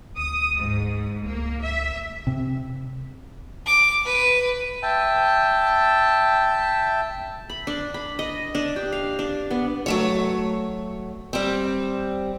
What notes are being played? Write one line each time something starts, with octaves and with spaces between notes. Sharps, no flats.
D2 D#6
G#2
C#2 A#3
E5
C3
D6
B4
E5 G5 A5
B5
D4
B5
D#5
D4
G4
F5
D4
B3
F#3 A3 C#5
G3 C4